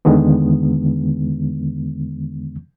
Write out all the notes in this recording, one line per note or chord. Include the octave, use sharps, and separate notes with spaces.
E2 D3 D#3 G#3 B3